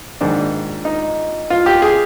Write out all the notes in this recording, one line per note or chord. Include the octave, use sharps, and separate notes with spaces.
A#1 G#2 D#3 D4
D#4
F4
G4
G#4